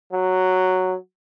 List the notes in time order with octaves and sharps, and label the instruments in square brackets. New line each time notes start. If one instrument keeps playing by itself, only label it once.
[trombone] F#3